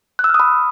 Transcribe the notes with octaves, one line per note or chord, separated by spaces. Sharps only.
F#6
E6
F6
D#6
B5